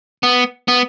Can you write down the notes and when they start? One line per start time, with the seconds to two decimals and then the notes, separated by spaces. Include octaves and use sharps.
0.23 B3
0.68 B3